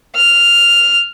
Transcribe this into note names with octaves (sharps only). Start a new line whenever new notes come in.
F6